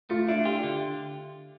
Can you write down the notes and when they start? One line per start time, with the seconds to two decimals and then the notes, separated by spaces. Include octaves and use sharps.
0.10 A3 F4
0.28 D4 E4
0.45 F4 G4
0.63 D3